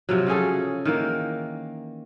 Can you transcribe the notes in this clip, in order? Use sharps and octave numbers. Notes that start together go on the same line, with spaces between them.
C3 F3 F#3
C#3 C#4 G#4 A4
D#3 E3 A#3